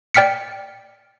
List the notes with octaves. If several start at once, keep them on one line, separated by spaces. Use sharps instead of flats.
D5 G5 F6 B6 C#7